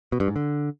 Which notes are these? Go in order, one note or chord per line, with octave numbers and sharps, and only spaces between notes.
B2
G2
G#2
D3